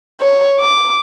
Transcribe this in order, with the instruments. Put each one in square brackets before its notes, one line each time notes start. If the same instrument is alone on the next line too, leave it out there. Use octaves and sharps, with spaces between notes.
[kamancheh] C#5
D6